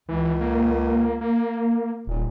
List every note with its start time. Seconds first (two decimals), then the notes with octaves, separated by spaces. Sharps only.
0.09 C#2 E3
0.41 A#3
1.21 A#3
2.07 D#1 A#2